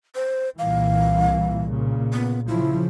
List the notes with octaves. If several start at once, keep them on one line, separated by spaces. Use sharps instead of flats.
C5
C2 A#2 E3 F5
A#2 C#3
B3
C#3 F3 E4